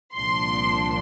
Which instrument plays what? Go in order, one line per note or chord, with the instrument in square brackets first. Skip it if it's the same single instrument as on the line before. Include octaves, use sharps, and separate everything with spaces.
[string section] C2 A#2 F3 D4 C6